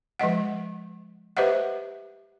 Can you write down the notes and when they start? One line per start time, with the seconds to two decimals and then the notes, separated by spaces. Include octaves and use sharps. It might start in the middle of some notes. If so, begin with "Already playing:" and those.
0.19 F3 G#3 D#5 F#5
1.37 G4 B4 C5 D#5 E5 F#5